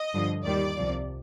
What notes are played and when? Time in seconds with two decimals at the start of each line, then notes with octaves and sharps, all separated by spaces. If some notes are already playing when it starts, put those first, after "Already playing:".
Already playing: D#5
0.13 G2 D3 F3
0.45 D#2 D#3 G3 D5
0.76 C2 C3 F3